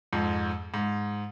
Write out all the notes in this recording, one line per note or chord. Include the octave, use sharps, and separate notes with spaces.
F2 G#2
G#2